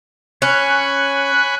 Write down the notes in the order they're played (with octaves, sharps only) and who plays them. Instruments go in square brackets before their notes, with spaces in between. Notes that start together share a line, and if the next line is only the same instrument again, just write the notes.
[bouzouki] C#4 [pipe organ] G#5 B5 C#6 [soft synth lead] F#6